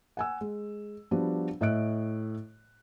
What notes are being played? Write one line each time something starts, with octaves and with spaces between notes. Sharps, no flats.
F#5 G#5 E6
G#3
F3 G3 B3 D4 F#4
A2 D#5 E5 F#6 D7